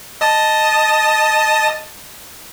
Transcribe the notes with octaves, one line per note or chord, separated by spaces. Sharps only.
D#5 A5 D#6